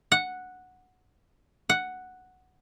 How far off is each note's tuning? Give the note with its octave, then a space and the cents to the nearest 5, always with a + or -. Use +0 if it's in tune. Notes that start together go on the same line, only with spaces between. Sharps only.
F#5 -5
F#5 +0